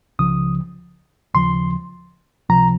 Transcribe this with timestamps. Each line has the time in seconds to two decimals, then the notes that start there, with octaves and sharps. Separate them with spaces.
0.19 C#2 C#3 F3 D#6
1.34 D#2 C#3 F3 C6
2.49 C#2 C3 F3 A#5